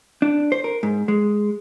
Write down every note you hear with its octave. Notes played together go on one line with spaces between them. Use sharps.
D4
C5
A#4
G#2
G#3